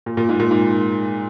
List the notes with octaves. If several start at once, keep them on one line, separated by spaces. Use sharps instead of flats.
A#2
A#2
G#2
A#2
G#2